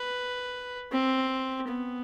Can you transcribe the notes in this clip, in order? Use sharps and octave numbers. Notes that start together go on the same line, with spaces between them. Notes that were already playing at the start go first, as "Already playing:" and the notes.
Already playing: B4
C4
B3